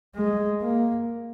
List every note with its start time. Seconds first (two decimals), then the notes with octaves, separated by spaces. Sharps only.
0.16 G#3
0.61 A#3